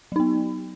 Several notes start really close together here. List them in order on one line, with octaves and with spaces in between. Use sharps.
F#3 D#4 B3